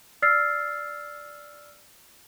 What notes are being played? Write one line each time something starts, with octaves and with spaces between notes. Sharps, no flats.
D5 E6 F6 A6 C7